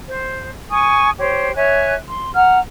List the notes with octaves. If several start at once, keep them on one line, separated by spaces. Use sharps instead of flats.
C5
G#5 C#6 D#6
G4 C5 C#5
C#5 E5 G#5 F#6
C6
F#5 A#5 F6